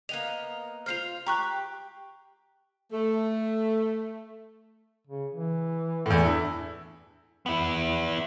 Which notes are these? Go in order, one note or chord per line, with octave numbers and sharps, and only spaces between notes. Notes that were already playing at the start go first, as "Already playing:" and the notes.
A#3 B3 D#5 F7
F4 C5 F6 C7 F7
G4 A#5 C#6 F#6
A3
C#3
E3
E2 A2 A4
D4 E4
B3 E4